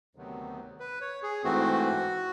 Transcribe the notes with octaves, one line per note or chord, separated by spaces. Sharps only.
D2 C3 D#3 F#3 B3
B4
C#5
G#4
G#2 E3 A3 C4 F#4